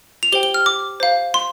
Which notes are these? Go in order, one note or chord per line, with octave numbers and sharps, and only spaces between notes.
F7
G4 C5 G5 G7
G7
F6
D6
C5 F5
C6